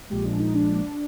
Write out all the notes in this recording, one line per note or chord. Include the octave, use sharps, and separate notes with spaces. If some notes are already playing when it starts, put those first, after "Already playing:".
A#1 A#2 F3 G#3 G4
D4
D#4
D4